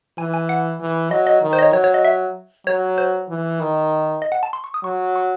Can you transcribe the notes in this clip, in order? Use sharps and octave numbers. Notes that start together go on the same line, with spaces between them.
E3 G#5
G#5
F#5
E3
F#3 D#5
D#5
D#3
C5
D#5
C#5
F#3 C#5
C#5
D#5
E5
F#3 C#5
C5
E3
D#3
D#5
F#5
A5
C6
C#6
D#6
F#3 C#6
C#6